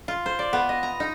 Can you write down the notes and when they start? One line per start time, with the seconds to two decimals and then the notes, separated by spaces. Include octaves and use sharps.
0.08 F4
0.26 C5
0.39 D5
0.53 B3
0.69 D#5
0.83 A#5
1.00 D#4